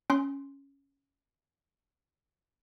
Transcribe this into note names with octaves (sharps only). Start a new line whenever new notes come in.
C#4 C6